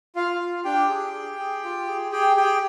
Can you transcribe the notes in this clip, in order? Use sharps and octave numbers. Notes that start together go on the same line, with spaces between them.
F4 F5
F4
D4 G4 G5
G#4
G#4
G#4
F4
G#4
G4 G#4 G5
G4 G#4 G5